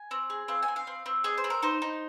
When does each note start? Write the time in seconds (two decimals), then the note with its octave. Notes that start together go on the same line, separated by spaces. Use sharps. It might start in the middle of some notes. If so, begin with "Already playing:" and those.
Already playing: G#5
0.11 C4
0.30 G#4
0.48 C4 F5
0.63 G#5
0.68 C4
0.76 F5
0.87 C4
1.06 C4
1.24 G#4 D#5
1.37 C5
1.44 C4
1.50 A#4
1.63 D#4 C5
1.82 D#4